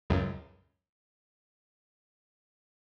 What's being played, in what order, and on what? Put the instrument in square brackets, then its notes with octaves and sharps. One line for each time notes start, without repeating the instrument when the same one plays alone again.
[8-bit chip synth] C#2 F#2